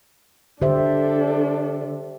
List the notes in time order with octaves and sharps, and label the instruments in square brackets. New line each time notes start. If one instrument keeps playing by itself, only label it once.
[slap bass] D3 [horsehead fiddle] D4 A4 [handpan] G4 C5 E5